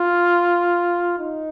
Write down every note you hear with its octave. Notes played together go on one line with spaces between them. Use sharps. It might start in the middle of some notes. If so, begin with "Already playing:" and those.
Already playing: F4
D#4